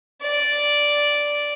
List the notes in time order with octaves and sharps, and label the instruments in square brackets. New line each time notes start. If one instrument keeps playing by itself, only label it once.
[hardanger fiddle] D5